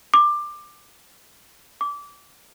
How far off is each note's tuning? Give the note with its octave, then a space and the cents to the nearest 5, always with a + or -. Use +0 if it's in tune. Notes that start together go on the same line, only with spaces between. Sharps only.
D6 +20
D6 -20